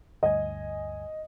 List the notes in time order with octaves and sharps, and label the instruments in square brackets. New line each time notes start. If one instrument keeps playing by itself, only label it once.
[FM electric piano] D2 G2 G#5 [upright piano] D#5